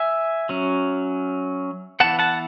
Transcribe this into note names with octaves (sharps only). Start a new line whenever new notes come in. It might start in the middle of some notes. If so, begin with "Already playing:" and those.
Already playing: E5 G#5
F#3 C#4
E3 B3 F#5 A5
F#5 A5